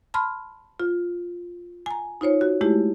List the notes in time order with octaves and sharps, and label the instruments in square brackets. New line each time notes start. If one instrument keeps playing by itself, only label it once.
[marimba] A5 B5 C6 F6
F4
G#5 A#5
D#4 F4 C5 C#5
F#4
G#3 A3 E4 G4